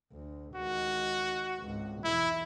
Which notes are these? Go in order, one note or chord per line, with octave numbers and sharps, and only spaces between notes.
D2
C#2 D#3 F#4
G#1 C#2
B1 E2 E4